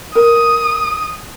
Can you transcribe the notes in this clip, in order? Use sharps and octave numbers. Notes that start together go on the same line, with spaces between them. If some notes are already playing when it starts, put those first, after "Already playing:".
A#4 D#6